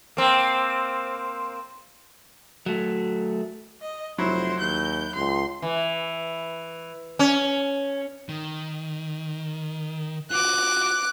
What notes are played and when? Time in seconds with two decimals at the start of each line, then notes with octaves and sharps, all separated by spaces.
0.17 A#3 C4
2.66 F#3 A3
3.81 D#5
4.18 F1 F#3 E4 C5
4.60 D#2 G6
5.16 C#2 C6
5.62 E3
7.19 C#4
8.29 D#3
10.31 F4 F#4 D6 F#6